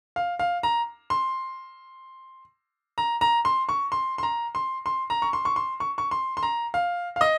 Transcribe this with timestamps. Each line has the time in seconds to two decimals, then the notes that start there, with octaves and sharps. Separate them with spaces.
0.16 F5
0.39 F5
0.63 A#5
1.10 C6
2.98 A#5
3.21 A#5
3.45 C6
3.69 C#6
3.92 C6
4.18 C6
4.23 A#5
4.55 C6
4.86 C6
5.10 A#5
5.22 C#6
5.33 C6
5.45 C#6
5.56 C6
5.80 C#6
5.98 C#6
6.11 C6
6.37 C6
6.43 A#5
6.74 F5
7.16 F5
7.21 D#5